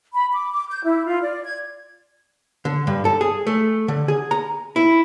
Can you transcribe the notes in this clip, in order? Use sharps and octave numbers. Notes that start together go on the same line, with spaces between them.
B5
D6
D6
G6
E4
F4
D5
G#6
D3
G2
A4
G#4
A3
D3
G#4
A#5
E4